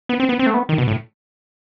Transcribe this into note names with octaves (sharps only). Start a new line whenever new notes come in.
B3
C4
B3
C4
A3
B3
D#3
B2
A2